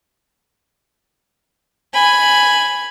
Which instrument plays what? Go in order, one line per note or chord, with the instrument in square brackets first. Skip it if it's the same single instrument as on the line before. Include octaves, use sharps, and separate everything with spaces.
[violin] G#5 B5